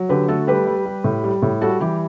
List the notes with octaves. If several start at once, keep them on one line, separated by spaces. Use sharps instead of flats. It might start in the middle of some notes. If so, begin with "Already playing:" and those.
Already playing: F#3
D3 G4 B4
A3 F#4 A4
G3 G4 B4
G3
G3
A2
G3
A2
G3 F#4 A4
E3 G4